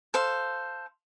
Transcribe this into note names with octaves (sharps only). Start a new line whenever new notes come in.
A4 C5 F5